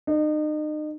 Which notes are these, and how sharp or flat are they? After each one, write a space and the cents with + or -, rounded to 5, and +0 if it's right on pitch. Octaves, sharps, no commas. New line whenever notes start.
D#4 -35